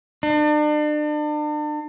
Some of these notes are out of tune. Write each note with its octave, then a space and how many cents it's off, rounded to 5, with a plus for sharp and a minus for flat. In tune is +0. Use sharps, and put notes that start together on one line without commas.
D4 +40